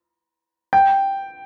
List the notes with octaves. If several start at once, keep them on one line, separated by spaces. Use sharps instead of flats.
G5